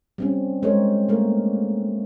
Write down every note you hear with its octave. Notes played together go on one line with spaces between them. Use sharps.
G3 C4 C#4
G#3 A#4 C5 C#5
A3 A#3 A#4